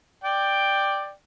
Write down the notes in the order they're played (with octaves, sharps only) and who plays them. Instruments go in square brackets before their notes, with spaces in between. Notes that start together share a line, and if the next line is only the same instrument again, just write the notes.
[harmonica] D5 G5